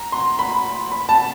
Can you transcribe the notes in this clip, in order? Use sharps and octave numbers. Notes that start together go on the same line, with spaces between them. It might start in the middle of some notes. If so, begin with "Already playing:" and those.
Already playing: A#5
C6
B5
B5
A5